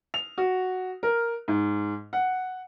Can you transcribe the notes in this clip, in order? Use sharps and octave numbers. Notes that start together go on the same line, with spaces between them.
F7
F#4
A#4
G#2
F#5